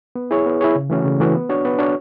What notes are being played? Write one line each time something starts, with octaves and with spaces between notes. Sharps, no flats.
B3
E4 G#4 C#5
B3
E4 G#4 C#5
C#3
E3 A3 C#4 F#4
C#3
E3 A3 C#4 F#4
B3
D4 F#4 C#5
B3
D4 F#4 C#5